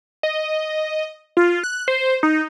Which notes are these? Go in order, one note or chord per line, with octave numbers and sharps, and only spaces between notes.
D#5
F4
F#6
C5
D#4